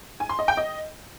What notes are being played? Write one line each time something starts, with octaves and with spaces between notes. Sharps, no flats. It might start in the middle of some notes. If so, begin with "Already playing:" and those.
G#5
C6
D#5
G5
D#5